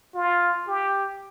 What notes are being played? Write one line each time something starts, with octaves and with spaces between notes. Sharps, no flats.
F4
G4